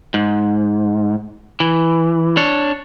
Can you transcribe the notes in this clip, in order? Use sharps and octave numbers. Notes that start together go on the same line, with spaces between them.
G#2
E3
D4 C#5